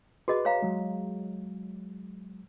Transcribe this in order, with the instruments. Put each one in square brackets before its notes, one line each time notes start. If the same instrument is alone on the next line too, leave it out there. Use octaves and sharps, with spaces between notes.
[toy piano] F#4 G#4 D#5 [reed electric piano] B4
[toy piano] C#5 F5 A#5
[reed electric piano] F#3 G#3